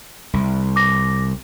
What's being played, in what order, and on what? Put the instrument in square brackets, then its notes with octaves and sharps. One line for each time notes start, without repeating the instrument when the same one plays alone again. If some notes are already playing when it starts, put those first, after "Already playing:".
[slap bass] C2
[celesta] D6 A#6